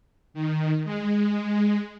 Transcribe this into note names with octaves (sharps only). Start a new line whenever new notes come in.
D#3
G#3